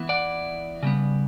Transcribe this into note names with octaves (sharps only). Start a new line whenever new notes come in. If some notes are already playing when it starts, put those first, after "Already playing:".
Already playing: E3 B3 E4
D5 F#5
C#3 G3 B3